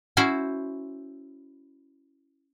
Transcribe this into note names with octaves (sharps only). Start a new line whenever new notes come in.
C#4 E4 F#4 C5 E5